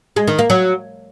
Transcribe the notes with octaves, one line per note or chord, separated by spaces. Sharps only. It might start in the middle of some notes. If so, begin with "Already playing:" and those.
G#3
D#3
A#3
F#3